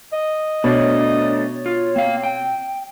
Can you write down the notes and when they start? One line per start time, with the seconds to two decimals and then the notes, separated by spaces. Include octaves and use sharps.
0.13 D#5
0.64 B2 A3 D4 C#5
1.66 F4
1.96 A#3 C4 F5
2.24 G5